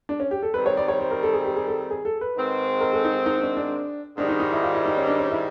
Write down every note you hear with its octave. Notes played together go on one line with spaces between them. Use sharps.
D4
C#4
G4
A4
D#3 G3 C4 B4
C#5
D5
C#5
C5
A#4
A4
G#4
G4
G#4
A4
G#4
A4
B4
G#2 D#3 G#3 C4
A#4
A4
D#4
D#4
D4
D4
G#2 D#3 G3 D4
D#4
D#4
E4
F4
E4
D#4
C#4
D4
C#4
E4